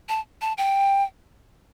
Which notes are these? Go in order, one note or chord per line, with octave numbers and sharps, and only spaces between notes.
A5
A5
G5